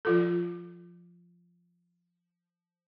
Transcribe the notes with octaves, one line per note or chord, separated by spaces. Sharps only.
F3 F4 A4